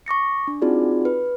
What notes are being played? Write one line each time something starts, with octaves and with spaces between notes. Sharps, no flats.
C#6 D6 A#6 C#7
D4
C4 D#4 F4 F#4 G#4 D5
B4